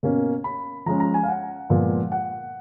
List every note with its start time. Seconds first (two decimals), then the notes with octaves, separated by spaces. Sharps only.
0.03 B2 A#3 C#4
0.44 B5
0.86 F3 G#3 C#4 A#5
1.00 A#5
1.14 G#5
1.23 F5
1.28 F#5
1.70 A#2 F3 G#3 B3
2.12 F#5